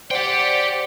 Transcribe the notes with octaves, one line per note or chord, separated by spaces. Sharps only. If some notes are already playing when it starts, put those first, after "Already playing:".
G4 C5 D5 F#5 G5